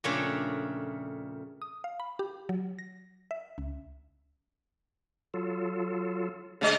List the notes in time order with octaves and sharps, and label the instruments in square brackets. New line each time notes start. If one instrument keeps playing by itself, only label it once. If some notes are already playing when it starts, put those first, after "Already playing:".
[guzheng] F2 A#2 C#3 A3 D4 C#5
[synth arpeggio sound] D#6
F5
B5
G4
F#3
A#6
E5
C#2
[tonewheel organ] F#3 F4 A4
[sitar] C#3 G#3 D#5 [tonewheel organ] A3 D4 G4